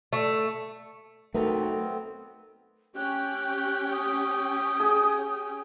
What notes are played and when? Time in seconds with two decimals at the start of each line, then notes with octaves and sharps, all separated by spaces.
0.13 A3
1.34 B1 A3 B3 C4 A#4 B4
2.96 C#4 G4 G5 F#6
3.92 D#6
4.80 G#4